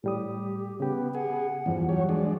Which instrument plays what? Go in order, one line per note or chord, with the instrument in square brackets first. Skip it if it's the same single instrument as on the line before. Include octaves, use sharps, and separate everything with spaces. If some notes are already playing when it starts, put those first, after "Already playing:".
[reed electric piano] A2 G3 D#6 [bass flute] G4
[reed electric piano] C#3 G4 [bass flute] B3
[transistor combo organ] G#4 [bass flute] F#5
[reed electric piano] E2 F3 [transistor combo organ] G2
[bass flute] F#3 [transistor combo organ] G3 C#5
[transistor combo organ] G#3 D4